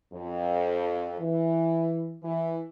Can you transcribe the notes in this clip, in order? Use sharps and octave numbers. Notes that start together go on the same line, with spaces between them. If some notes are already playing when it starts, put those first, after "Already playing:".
F2
E3
E3